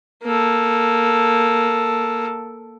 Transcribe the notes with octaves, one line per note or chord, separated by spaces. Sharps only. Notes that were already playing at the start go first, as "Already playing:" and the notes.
A#3 A4